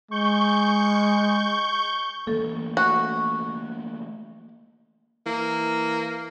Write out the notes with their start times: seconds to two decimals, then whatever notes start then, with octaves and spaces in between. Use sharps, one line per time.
0.11 G#3 C#6 G6
2.27 E3 A3 A#3 A4
2.77 F#4 F#6
5.26 E3 A#3